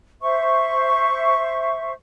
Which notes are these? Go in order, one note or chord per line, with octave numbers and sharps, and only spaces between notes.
C5 E5 C#6